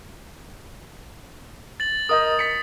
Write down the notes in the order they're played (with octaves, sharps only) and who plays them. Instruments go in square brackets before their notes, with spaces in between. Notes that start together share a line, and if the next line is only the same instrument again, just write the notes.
[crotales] A6 F#7
[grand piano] A#4 D#5 G6 [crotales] D#6
[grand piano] B6 C#7